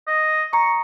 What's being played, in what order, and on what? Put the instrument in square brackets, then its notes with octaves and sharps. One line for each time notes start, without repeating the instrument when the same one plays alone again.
[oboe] D#5
[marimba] A#5 [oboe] C#6